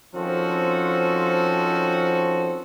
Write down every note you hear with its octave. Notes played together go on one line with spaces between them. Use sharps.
D#3 F3 C4 C#4 F#4 A4